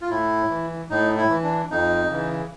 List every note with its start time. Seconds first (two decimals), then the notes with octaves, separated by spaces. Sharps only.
0.02 F4
0.10 A2 E4
0.49 E3
0.90 A2 D#4
1.17 E4
1.30 E3
1.43 D4
1.70 F2 D#4
2.10 C#3 E3